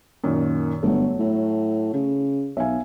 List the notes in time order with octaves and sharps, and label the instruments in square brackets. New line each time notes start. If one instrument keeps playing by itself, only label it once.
[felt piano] F#2 A#2 D#3
[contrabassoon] G1 [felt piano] F#3 A3
[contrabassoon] A2
C#3
[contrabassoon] B1 [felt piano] E5 F5 G#5